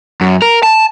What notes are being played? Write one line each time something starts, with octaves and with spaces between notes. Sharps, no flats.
F#2
A#4
A5